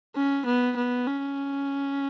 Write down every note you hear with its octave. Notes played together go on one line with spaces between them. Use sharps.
C#4
B3
B3
C#4